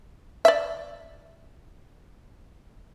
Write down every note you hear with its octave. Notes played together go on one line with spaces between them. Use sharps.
D5 E5